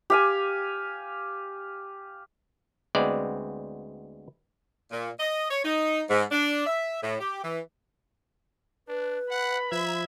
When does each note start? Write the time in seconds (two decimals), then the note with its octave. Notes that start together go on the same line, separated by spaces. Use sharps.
0.10 G4 F5 G#5
2.95 D2 G#3 B3 C4 D5
4.91 A#2
5.19 D#5
5.51 C#5
5.65 D#4
6.10 G#2
6.31 D4
6.66 E5
7.03 A2
7.20 G4
7.44 E3
8.88 D4 B4
9.31 F#5 B5
9.72 F3 E5 G#6